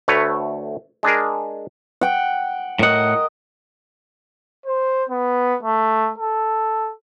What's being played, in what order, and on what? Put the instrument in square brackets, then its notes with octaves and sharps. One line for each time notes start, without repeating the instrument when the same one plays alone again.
[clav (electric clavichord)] D2 A3 B4 C#5
G#3 D4 G#4 A#4
[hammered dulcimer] F#5 G5
[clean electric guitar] A2 F#5 [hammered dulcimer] A#4 D#5
[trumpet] C5
B3
A3
A4